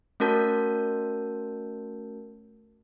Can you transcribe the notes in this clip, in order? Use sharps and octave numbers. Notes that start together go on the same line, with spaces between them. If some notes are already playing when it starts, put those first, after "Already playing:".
A3 C#4 F#4 A#4 A5 G6